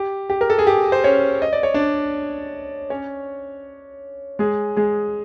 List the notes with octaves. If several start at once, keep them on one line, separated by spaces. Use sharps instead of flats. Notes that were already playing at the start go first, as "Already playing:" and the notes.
Already playing: G4
G4
A#4
A4
G#4
G4
C5
C#4 C#5
D#5
D5
C#5
D4 D5
C#4 C#5
G#3 G#4
G#3 G#4